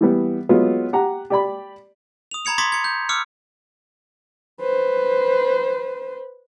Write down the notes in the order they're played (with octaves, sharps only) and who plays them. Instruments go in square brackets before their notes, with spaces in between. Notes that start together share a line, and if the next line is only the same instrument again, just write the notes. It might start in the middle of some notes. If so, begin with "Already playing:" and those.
[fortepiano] E3 G3 B3
F#3 G#3 B3 F4
G4 F#5 A#5
G4 D5 B5
[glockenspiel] D#6 F7
A#5 B5 G#6 C#7 F7
C6 D6 D#6 G#6 A6 B6
G#6 C#7
G6
D6 E6 F6 C#7
[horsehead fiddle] B4 C5